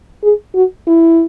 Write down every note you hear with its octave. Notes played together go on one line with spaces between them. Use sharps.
G#4
F#4
E4